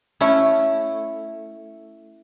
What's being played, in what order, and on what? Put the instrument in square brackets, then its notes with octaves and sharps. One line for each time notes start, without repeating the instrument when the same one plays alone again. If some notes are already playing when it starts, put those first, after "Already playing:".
[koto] A3 C#4 E4